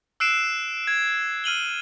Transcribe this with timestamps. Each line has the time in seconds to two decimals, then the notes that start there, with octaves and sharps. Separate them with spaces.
0.20 E6 F#6 C7 D7 E7
0.87 G#6
1.44 F6 D#7 F#7 G7